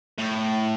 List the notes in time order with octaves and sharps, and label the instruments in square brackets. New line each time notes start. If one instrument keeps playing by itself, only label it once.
[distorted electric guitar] A2